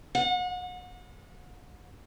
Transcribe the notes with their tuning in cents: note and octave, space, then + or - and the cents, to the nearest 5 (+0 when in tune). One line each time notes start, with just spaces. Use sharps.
F#5 -35